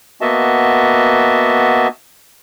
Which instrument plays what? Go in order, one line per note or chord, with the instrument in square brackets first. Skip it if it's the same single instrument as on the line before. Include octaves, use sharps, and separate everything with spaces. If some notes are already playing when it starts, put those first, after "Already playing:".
[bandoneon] A#3 B3 F#4 D#5 E5 A5